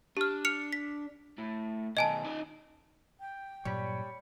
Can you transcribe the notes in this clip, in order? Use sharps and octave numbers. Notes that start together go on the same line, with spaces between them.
D4 G4 F6
F6 C#7 F7
B6
A2
B2 D#3 D#5 G#5 A5
D#4 D5
G5
G2 A#2 F#3 G3 C#5 B5